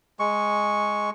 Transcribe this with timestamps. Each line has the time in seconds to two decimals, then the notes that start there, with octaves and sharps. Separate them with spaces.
0.20 G#3 C#6